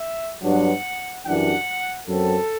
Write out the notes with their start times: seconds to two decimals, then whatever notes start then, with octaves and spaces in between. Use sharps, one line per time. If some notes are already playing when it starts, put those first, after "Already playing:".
Already playing: E5
0.42 G2 F#3 B3 D4 F#5
1.25 F#2 E3 G3 D4 F#5
2.07 F#2 F#3 C4 A4